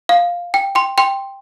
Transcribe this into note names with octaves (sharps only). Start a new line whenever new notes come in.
F5
G5
G5 C6
G5 C6